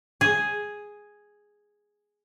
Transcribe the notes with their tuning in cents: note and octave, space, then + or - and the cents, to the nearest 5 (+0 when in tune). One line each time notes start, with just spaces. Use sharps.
G#4 +0